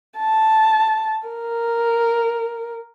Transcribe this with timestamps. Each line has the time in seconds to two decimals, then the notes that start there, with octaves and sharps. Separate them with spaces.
0.19 A5
1.28 A#4